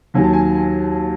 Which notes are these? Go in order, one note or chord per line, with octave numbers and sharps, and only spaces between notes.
D#2 D#3 F#3 G#5
A5
G#5
G#5